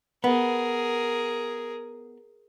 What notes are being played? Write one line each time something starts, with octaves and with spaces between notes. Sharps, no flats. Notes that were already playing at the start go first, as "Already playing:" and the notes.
B3 G#4 A#4